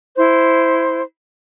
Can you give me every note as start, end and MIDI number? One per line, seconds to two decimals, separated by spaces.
0.16 1.01 64
0.16 1.01 72